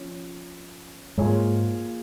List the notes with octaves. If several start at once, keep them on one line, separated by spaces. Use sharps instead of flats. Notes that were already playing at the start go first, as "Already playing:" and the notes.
Already playing: F3 C#4 C#5
G#2 G#3 A#3 F4 G#4 C#5